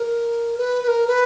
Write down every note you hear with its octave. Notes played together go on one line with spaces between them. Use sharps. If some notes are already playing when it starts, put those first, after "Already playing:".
Already playing: A#4
B4
B4
A#4
B4